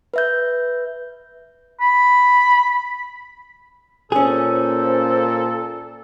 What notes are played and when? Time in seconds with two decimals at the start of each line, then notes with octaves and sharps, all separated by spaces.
0.14 B4 E5 G6
1.80 B5
4.12 A#2 C#4 G#4 A4 C5